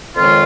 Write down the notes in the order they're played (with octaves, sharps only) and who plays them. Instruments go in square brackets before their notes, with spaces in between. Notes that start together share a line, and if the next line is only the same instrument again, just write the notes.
[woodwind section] F2 D#3 G#3 C#4 F4